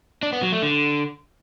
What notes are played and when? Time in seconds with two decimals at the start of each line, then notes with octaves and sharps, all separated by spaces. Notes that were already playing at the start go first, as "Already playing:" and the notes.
0.23 D4
0.33 B3
0.43 F#3
0.52 A3
0.62 D3